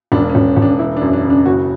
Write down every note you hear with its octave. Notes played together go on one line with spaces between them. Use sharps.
E1 D4
C#4
E1
E1
D4
E3 E4
F#2 D4
D4
C#3
D4
F#1 F#4